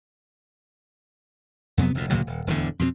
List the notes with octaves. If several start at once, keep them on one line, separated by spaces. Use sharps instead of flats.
F2 C3 F#3 B3
F1 D2 A#2
D2 A#2 C#3 F#3
D#1
D1 E2 A2 D3
F2 B2 D#3 C4